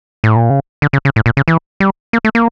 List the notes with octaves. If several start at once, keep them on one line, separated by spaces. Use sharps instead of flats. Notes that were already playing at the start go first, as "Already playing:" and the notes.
A2
A#2
C#3
D3
C#3
C#3
A2
A#2
C#3
E3
G3
A#3
A3
A#3